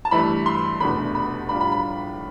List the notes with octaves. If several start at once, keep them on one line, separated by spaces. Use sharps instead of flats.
A5
G2 E3 A3 E4 B5
C6
F1 E2 B2 A3 D4 B5
B5
A2 G3 D4 F4 B5
B5
B5